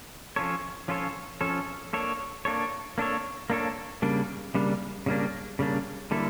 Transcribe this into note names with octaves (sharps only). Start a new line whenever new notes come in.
F3 C#4 F4 A4 C#5
F3 C#4 F4 A4 C#5
F3 C#4 F4 A4 C#5
A#3 D4 A4 C#5
A#3 D4 A4 C#5
A#3 D4 A4 C#5
A#3 D4 A4 C#5
C#3 G3 A#3 D4
C#3 G3 A#3 D4
C#3 G3 A#3 D4
C#3 G3 A#3 D4
D3 G3 A#3 E4 A4